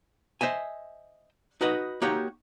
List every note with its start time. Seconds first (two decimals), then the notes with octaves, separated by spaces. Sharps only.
0.41 C5 D#5 E5 G#5
1.61 D#4 F#4 B4 D#5
2.02 A#3 D#4 F#4 G4 C#5